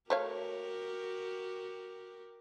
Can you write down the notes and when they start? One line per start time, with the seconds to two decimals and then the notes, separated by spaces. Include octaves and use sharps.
0.10 A3 F#4 G4 A#4 C#5 F5